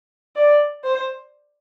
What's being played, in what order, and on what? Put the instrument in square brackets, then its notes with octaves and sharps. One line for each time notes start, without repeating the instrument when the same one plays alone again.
[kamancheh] D5
C5